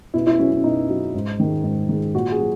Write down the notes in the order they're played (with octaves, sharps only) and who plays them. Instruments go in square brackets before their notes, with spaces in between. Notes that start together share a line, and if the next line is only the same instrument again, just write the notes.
[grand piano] B2 E4
E4
F#3 C#4
C#4
B2 D#4
F#3
G#2
D#3 G#3
G#2
D#3 G#3
A#2 F#4
G#4
F#3